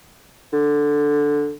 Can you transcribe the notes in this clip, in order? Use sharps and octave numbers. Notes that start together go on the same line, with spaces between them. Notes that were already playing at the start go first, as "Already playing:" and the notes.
D3